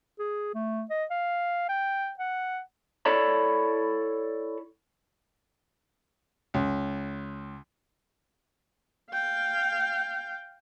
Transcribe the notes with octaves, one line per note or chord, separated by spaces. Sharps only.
G#4
A3
D#5
F5
G5
F#5
E4 A4 C#5 D5 A5 B5
C#2
F5 G5